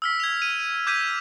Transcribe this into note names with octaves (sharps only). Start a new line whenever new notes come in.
E6 F6 B6
G#6 F7
D#7
D#7
D6 G6 G#6 B6 D#7